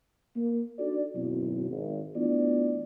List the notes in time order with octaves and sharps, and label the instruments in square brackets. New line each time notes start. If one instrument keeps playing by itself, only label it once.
[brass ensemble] A#3
D4 D#4 F#4 A4 D5
G#1 F#2 B2 F#3 C4 E4
G#1
E3 A3 B3 D4 F4 D5